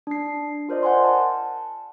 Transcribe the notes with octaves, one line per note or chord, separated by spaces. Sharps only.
D4 C7
F4 A#4 C5 D5 D#5
F#5 G#5 C6
A5